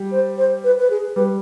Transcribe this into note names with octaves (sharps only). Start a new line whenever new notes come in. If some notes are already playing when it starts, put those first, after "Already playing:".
Already playing: G3
C5
C5
B4
B4
G#4
G3 B4